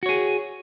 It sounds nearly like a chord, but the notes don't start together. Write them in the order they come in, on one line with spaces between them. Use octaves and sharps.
F#4 C#5 G#4